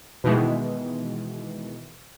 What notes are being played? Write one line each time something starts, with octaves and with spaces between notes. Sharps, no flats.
B2 D#3 E3 G#3